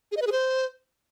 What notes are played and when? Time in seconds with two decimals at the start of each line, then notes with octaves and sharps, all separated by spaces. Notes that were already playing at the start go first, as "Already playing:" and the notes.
0.12 G#4
0.17 D#5
0.22 B4
0.27 G#4
0.32 C5